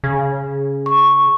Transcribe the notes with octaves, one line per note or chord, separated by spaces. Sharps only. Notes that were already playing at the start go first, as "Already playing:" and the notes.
C#3
C#6